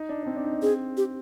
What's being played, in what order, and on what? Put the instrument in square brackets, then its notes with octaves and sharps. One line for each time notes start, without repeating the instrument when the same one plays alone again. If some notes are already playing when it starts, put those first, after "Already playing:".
Already playing: [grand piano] D#4
D4
D4
C4
D4
D#4
D4
[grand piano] C4 [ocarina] G#4
[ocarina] G4